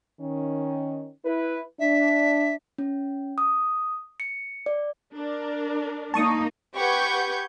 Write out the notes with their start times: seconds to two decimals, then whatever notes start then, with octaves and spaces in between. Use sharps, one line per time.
0.21 D#3 C#4
1.26 E4 B4
1.80 D4 E5
2.78 C#4
3.38 D#6
4.20 C#7
4.66 D5
5.15 D4 A#4
6.14 A#3 D#4 A5 C#6 D#6
6.76 G4 B4 F#5 C#6 G6 G#6